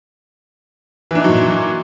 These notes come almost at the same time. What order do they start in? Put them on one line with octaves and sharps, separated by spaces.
E3 D4 D#4 F#3 A#2